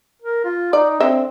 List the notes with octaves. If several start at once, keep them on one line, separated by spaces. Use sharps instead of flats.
A#4
F4
D#4 D5
D3 C4 D#5 E5